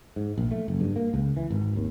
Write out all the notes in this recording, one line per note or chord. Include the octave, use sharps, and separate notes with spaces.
G#2
A#1
A3
F#1
G2
A#3
C#2
E3
G#1
D#2